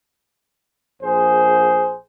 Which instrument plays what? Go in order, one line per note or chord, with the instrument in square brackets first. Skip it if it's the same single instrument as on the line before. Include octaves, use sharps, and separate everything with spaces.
[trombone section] A#1 G#4 C5